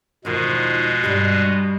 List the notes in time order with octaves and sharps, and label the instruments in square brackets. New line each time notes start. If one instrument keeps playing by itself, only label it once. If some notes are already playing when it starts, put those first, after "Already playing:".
[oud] E2 D#3 F3 [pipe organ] B2 G#3
[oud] G2 G3